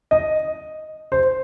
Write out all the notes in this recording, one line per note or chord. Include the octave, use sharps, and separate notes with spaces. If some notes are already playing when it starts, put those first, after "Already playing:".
D#5
C5